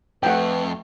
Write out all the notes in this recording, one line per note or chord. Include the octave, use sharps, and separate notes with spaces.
F2 A3 B4 F#5 G5